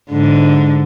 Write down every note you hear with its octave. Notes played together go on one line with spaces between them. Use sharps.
G#2 D3